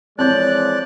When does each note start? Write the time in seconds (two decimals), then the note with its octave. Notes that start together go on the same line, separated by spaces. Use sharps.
0.19 E3 F3 G#3 C4 C#5 D5 F#6 G6